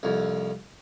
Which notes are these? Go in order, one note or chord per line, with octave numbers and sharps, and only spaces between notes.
C2 F2